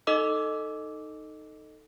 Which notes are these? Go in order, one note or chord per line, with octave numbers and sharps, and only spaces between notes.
D#4 A4 D#5 D6 E6